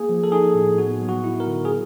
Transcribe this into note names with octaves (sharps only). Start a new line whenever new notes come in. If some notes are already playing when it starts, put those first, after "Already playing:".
Already playing: A#3 G#4
F3
A4
D#4 G#4
A2
B3 F#4
F#3
F#4
E4
A#4
D3
G#4